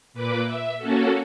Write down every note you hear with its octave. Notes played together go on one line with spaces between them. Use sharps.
A#2 B4 D6
E5
A#3 C#4 F#4 A4